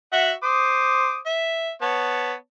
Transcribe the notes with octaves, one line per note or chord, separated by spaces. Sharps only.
F#4 E5 F#5
C5 D6 D#6
E5
B3 C#5 A5